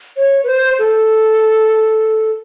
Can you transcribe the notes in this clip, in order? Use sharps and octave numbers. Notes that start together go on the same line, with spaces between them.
C#5
B4
C5
A4